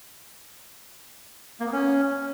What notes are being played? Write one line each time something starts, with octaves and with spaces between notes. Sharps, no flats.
A#3
B3
C#4